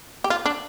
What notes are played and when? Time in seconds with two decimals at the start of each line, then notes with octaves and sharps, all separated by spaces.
0.24 G4
0.30 F4
0.46 D4